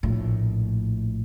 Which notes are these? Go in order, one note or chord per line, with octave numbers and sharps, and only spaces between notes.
A#1 A2